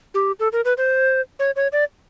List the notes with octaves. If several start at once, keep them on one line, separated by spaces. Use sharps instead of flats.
G4
A4
A#4
B4
C5
C#5
C#5
D5